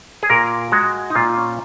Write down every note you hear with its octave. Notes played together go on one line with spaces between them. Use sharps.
G#4
A#2 A#4
G#3 F#4
D#4
A#2 F4
C#4